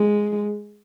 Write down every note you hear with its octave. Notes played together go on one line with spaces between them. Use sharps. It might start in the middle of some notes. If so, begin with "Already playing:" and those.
Already playing: G#3